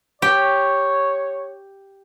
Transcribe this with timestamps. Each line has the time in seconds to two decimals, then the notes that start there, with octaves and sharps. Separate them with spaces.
0.22 G4 C#5